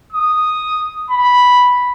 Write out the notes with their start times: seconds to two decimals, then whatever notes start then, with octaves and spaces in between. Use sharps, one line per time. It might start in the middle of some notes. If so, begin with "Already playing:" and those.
0.13 D#6
1.10 B5